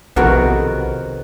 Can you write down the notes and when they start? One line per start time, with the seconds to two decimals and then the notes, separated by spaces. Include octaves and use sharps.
0.16 B1 F2 C3 D#3 B3 F#4 A#4 B4